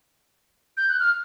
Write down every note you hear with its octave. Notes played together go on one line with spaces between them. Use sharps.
G6
F#6
F6